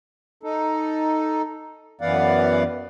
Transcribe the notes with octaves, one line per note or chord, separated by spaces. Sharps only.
D#4 A4
F#2 E3 B3 D5 F5 F#5